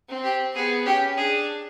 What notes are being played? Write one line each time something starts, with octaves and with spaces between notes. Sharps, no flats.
C4
G4
B3 G#4
C#4 G4
D4 G#4